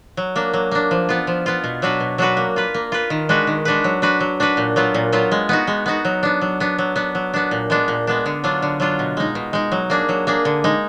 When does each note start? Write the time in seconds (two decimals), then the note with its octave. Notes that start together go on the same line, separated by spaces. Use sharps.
0.17 F#3
0.36 A#3 D4
0.53 F#3
0.71 A#3 D4
0.91 F3
1.09 B3 F4
1.27 F3
1.46 B3 F4
1.64 B2
1.82 F#3 D4 F#4 B4
2.00 B2
2.18 F#3 D4 F#4 B4
2.37 A#3
2.56 F4 B4
2.74 A#3
2.92 F4 B4
3.10 D#3
3.29 G#3 D4 F#4 B4
3.47 D#3
3.65 G#3 D4 F#4 B4
3.84 F#3
4.02 D4 F#4 B4
4.20 F#3
4.40 D4 F#4 B4
4.57 A#2
4.76 F#3 B3 F4
4.94 A#2
5.12 F#3 B3 F4
5.31 G#3
5.49 B3 D#4 F#4
5.67 G#3
5.86 B3 D#4 F#4
6.05 F#3
6.23 B3 D4
6.41 F#3
6.60 B3 D4
6.78 F#3
6.96 B3 D4
7.15 F#3
7.34 B3 D4
7.51 A#2
7.70 G#3 B3 D4
7.88 A#2
8.07 G#3 B3 D4
8.26 D3
8.44 F#3 D4 F4
8.62 D3
8.80 F#3 D4 F4
8.99 B2
9.17 G#3 D#4
9.35 B2
9.53 G#3 D#4
9.72 F#3
9.90 A#3 D4 G#4
10.09 F#3
10.27 A#3 D4 G#4
10.45 D3
10.64 G#3 D#4